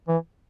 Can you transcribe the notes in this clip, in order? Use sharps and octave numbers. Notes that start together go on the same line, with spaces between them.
E3